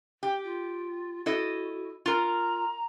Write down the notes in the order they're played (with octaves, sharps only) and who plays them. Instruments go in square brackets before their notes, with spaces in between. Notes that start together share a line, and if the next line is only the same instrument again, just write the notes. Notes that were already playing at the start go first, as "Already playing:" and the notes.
[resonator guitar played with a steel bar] G4
[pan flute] F4
[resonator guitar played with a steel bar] E4 A4 D#5 [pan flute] F#4
[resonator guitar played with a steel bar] F4 A#4 [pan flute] A#5